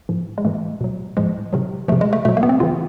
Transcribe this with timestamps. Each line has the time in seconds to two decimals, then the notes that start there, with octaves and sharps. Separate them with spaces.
0.09 A2 F3
0.38 G#3
0.45 A2 E3 A3
0.81 B2 F#3
1.17 A2 F3 G#3
1.53 C3 D#3 F#3
1.88 C3 F3 A3
2.01 G#3
2.13 A3
2.25 B2 F#3 A3
2.37 A#3
2.43 B3
2.49 C4
2.60 C#3 E3 F4